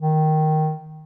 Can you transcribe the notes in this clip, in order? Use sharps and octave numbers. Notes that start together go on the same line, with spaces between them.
D#3